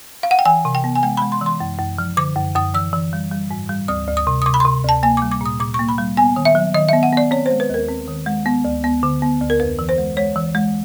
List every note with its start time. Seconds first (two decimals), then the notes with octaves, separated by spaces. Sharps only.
0.23 F5
0.31 F#5
0.39 G5
0.46 E3 G#5
0.65 C3
0.75 G5
0.84 B3
0.95 G#5
1.03 G#3 G5
1.17 B5
1.22 G#3
1.32 C6
1.41 E3
1.46 C6
1.60 F#2
1.79 F#2
1.98 F3
2.17 D3 D6
2.36 F#2
2.55 F#2 D#6
2.74 E3 E6
2.93 E3
3.13 G3
3.32 G3
3.51 G#2
3.69 G3
3.88 D2 D#6
4.07 D2
4.17 D#6
4.27 C3
4.42 D#6
4.46 C3 D6
4.54 B5
4.60 C6
4.65 C3
4.84 D2 A5
5.03 A#3 G#5
5.17 D6
5.22 G3
5.32 D6
5.41 A#2 D#6
5.60 A#2 D6
5.74 C#6
5.79 A#3
5.89 B5
5.98 G3
6.17 B3 G#5
6.36 D#3
6.45 E5
6.55 F#3
6.74 D#3 D#5
6.89 E5
6.93 B3
7.03 F#5
7.13 B3 D5
7.31 C4 C#5
7.46 C5
7.51 G#3
7.60 B4
7.70 D#2 A#4
7.89 C4
8.08 D#3
8.26 G#3
8.46 B3
8.65 D2
8.84 B3
9.03 D3
9.22 B3
9.41 D2
9.50 A#4
9.60 F2 B4
9.79 E3
9.89 C5
9.98 G#3
10.17 G#3 C#5
10.36 E3
10.55 G#3